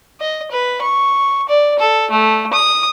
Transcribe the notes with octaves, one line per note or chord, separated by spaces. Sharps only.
D#5
B4
C#6
D5
A4
A3
D#6